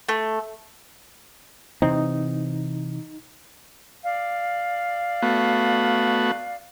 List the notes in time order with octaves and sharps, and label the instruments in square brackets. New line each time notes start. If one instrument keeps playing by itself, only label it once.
[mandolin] A3
[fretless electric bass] C3 E3 C4 [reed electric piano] D#4
[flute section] D5 F5
[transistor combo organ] A3 B3 F#4